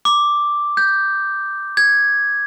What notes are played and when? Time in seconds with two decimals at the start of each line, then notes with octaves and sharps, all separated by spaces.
0.05 D6
0.77 G6
1.77 G#6